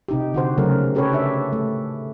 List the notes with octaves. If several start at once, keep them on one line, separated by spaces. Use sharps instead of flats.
C3 D#4 G4
D3 F#4 C5
C#3 F#3 A3 C#4 A#4
C#4 G4 A4 B4 C#5
D4 E5
A3